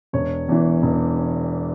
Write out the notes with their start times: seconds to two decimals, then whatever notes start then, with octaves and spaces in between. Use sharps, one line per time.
0.13 E1 C#5
0.49 E2 E3
0.82 E1